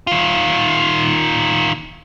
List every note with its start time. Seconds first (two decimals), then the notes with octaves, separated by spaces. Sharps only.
0.07 D#3 F4